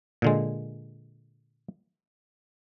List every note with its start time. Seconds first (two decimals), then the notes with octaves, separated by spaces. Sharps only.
0.22 A#2 D3 G#3